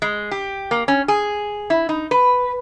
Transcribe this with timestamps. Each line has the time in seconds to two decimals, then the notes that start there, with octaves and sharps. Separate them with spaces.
0.02 G#3
0.31 G4
0.71 A#3
0.88 C#4
1.08 G#4
1.70 E4
1.89 D#4
2.11 B4